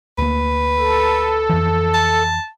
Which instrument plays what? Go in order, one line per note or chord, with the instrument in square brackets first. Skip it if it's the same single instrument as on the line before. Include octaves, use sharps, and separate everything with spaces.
[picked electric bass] D2 A#3 [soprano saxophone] B4
[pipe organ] A4
[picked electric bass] F2 E3
[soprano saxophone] A5